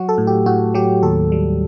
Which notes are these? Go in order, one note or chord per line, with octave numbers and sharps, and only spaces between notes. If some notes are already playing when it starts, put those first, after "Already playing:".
Already playing: F#3 F#4
A4
A2
G4
A2 F#4
F#3 G4
D#2 A4
G3